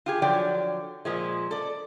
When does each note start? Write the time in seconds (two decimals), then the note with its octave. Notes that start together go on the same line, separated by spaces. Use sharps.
0.06 F4 G4 G#4
0.22 D3 F3 F#3 D5 G5
1.05 A#2 F3 G#3
1.51 A4 D5